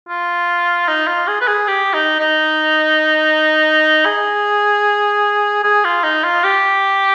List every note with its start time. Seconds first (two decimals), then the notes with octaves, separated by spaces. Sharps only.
0.09 F4
0.88 D#4
1.07 F4
1.27 G#4
1.41 B4
1.48 G#4
1.68 G4
1.94 D#4
2.20 D#4
4.06 G#4
5.64 G#4
5.85 F4
6.04 D#4
6.24 F4
6.44 G4